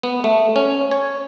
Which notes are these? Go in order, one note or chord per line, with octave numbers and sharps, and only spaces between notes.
B3
A3
C#4
C#5